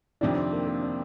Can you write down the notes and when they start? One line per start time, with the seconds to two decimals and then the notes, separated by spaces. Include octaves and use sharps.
0.21 F2 C3 D#3 D4
0.36 C4
0.52 A#3
0.67 A#3
0.83 D4